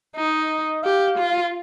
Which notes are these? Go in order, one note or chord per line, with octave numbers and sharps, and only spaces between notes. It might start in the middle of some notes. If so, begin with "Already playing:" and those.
D#4 D#5
G4 F5
F4